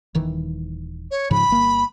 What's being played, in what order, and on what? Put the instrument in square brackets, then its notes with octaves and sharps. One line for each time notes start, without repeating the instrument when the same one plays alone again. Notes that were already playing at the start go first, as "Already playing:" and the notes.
[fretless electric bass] D#1 D#3 E3
[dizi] C#5
[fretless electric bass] G#2 C#3 F3 [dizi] B5
[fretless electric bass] G1 A#3